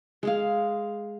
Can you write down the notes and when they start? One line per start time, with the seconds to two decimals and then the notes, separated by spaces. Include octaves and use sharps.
0.23 G#3 G#4 F5